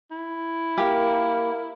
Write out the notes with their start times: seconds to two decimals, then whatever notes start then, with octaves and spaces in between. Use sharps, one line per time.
0.11 E4
0.78 A#3 G4 A#4